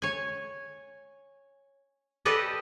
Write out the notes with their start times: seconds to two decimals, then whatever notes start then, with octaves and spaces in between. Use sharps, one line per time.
0.02 C#5 G#5
2.25 G4 A4 B4 D5 D#5